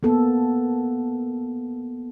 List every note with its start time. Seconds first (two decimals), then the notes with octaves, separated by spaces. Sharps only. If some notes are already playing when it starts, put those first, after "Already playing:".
0.03 A#3 B3 A4